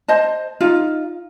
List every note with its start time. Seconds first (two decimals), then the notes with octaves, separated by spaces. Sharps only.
0.08 C5 D#5 A5
0.61 D#4 F4